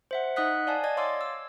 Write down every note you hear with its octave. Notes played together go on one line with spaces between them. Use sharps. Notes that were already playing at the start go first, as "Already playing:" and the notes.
C5 E5 F#5
D#4 D#5 F#5 D#6 F#6 B6
D5 F5 G#5 A5
D5 D#5 G#6
C#5 F5 C6 D6 E6 A6
E6